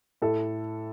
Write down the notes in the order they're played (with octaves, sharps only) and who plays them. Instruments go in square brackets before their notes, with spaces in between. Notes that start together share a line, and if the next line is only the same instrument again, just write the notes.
[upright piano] A2 A4